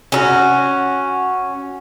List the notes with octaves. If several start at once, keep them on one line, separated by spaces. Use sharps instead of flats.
C#4 D#4 F#4